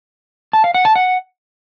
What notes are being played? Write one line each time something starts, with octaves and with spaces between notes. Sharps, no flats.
A5
F5
F#5
A5
F#5